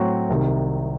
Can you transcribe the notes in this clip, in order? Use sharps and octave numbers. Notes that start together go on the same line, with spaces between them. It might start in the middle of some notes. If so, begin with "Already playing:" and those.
Already playing: A2 F#3 C4 F#4
C2 C3 D#3